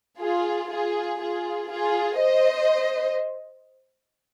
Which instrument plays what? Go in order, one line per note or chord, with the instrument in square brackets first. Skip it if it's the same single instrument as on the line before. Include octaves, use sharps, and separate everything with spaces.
[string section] F4 G#4
F4 G#4
F4 G#4
F4 G#4
C5 D#5